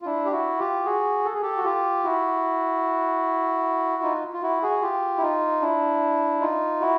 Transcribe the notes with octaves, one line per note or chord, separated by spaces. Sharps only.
F4
D4 E4
G4
E4 F#4
F4 G4
F#4 G#4
A4
G#4
G4 A4
F#4
F4 G4
E4 F#4
D#4 F4
F4
E4 F#4
F#4 G#4
F4 G4
E4
D#4 F4
D4 E4
D#4 F4
E4 F#4